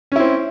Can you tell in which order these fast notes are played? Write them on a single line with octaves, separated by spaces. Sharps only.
C#4 E4 C4